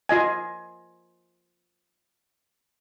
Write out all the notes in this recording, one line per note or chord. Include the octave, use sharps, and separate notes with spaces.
F4 D#5 G#5